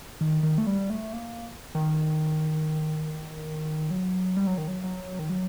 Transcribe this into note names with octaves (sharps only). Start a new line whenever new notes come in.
D#3
D#3
A3
G3
A3
A#3
D#3
F#3
G3
F#3
D#3
F#3
F#3
D#3
F#3